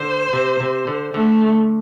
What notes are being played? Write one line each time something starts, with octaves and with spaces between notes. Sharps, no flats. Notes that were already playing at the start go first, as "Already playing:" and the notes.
Already playing: D3 C5
C3
C3
D3
D3 A3